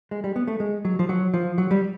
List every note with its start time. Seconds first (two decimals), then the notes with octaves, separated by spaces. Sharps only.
0.11 G#3
0.24 G3
0.36 B3
0.48 A3
0.60 G#3
0.85 F#3
0.99 F3
1.09 F#3
1.34 F3
1.58 F#3
1.71 G3